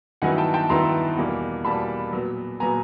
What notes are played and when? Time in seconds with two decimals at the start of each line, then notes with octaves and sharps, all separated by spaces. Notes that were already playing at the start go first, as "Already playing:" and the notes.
0.22 G2 D#3 F#3 B3 E4 F#5 G#5
0.38 G5 A5
0.54 G5 A5
0.69 G2 D#3 F#3 B3 E4 A#5 C6
1.17 E2 B2 G3 A#3
1.65 E2 B2 G3 A#3 A5 B5
2.13 A#2 F#3 B3
2.60 A#2 F#3 B3 G#5 A#5